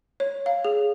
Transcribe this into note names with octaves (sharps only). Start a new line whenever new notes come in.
C#5
F5
G#4